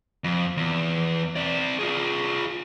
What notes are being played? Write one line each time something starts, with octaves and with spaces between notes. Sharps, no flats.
F2
E2
C4 D5
F4 G#4